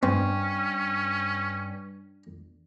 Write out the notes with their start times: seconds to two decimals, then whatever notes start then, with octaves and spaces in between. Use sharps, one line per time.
0.03 G2 C4 C#4